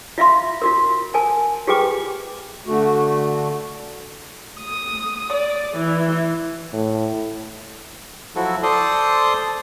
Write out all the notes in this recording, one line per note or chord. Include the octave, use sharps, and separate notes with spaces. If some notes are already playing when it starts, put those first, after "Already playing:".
F4 E5 F5 C6
F4 F#4 A#4
A#4 G#5 A5
F4 G4 G#4 B4 G5 D6
D3 A3 F#4
D#6
D5
E3
A2
F3 F#3 E4 F#4 A4
A4 C5 D5 A5 C6 D#6